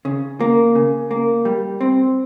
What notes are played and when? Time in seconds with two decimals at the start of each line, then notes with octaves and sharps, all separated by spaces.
0.05 C#3
0.40 A#3
0.75 C#3
1.11 A#3
1.45 G3
1.81 C4